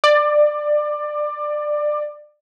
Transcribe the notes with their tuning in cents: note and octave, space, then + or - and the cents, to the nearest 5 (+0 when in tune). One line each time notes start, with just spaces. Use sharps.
D5 +20